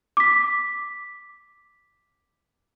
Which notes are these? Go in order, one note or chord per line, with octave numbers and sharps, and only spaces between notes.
D6 B6